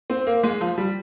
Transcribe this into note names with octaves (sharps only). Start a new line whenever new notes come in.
C4
A#3
G#3
F3
G3